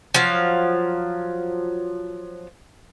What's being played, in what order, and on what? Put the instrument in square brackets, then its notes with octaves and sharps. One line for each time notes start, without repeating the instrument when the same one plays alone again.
[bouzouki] F3 F#3 F5